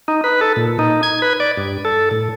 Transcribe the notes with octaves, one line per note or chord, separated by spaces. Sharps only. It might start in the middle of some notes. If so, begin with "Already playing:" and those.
D#4
B4
A4
A#2
D#4
G#6
B4
D5
G2
A4
A2